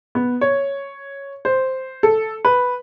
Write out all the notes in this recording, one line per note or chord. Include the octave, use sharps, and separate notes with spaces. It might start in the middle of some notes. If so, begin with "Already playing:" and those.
B3
C#5
C5
A4
B4